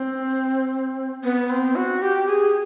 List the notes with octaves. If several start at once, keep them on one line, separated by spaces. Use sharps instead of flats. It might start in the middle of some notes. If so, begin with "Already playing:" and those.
Already playing: C4
B3
C4
F#4
G4
G#4